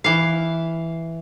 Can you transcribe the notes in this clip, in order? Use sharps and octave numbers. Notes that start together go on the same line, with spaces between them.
E3 F5